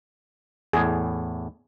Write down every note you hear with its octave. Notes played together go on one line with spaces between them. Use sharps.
E2 A2 G#4